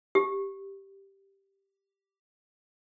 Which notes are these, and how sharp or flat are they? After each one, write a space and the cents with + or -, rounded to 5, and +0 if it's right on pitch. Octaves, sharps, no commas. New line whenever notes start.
G4 +0